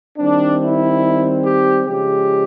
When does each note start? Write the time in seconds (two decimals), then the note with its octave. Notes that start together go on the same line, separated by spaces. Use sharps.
0.18 D#3 G3 C4 D4
0.61 E4
1.45 G4
1.87 C#3 F3 G#3 G4